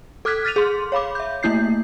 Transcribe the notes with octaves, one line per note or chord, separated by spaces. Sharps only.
A4 D6 F6 F#6 G#6 B6
F6 A6 B6 D#7 F7
G#4 C6
C#5 F5 B5 D6
E5 G6
A3 A#3 E4 G6 C7